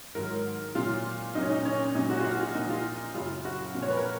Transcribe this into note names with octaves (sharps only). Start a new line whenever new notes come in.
G#2 D#3 F#3 A#4
A#2 F#3 F4
A#2 F#3 C#4 D#4
D#4
C#4
A#2 F#3 D#4
F#4
F4
F#4
F4
A#2 F3 D#4
F4
F#2 C#3 F#3 F4
F#4
A#2 F3
C#5
B4
A#4